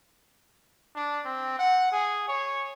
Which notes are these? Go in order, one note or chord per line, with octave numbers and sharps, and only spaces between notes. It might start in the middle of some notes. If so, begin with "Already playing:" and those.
D4
C4
F#5
G#4
C#5